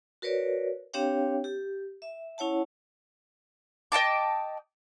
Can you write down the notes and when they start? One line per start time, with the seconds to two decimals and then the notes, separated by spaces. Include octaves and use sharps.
0.22 F#4 A#4 B4 C#5 D5
0.94 C4 D4 G4 C#5 F5 G5
1.44 G4
2.02 E5
2.38 C#4 E4 C#5 F#5 A5
3.92 D#5 G5 A5 D6